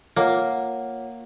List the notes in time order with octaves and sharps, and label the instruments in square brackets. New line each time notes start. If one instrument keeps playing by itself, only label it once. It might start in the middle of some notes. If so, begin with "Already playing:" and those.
[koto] A#3 [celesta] F4 C#5 F#5